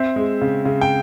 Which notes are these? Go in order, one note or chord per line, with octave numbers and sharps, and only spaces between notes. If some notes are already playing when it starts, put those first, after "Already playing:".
Already playing: C4 E5
G#3
C#3
C#3
G5